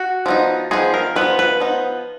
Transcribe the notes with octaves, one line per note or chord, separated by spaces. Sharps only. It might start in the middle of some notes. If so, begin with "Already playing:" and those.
Already playing: F#4
F3 B3 D#4
F3 B3 D#4 G#4
A#4
F3 B3 D#4 B4
B4
F3 B3 D#4